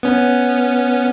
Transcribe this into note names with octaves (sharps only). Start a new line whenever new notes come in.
B3 C#4